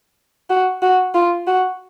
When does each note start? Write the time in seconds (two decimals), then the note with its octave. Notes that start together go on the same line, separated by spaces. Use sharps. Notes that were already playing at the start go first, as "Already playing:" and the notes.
0.50 F#4
0.82 F#4
1.15 F4
1.47 F#4